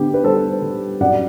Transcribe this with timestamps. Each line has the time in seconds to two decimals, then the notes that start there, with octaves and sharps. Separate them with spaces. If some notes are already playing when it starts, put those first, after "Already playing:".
Already playing: D3 B3 G4
0.14 B4
0.24 G3 A4 C5
0.62 G3
1.00 F#2 D5 F#5